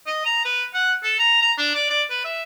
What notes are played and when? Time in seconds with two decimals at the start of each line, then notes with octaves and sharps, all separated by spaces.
0.06 D#5
0.26 A#5
0.45 B4
0.74 F#5
1.03 A4
1.19 A#5
1.42 A#5
1.58 D4
1.75 D5
1.90 D5
2.10 B4
2.24 E5